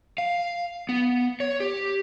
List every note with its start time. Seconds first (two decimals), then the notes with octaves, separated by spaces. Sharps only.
0.18 F5
0.89 B3
1.40 C#5
1.60 G4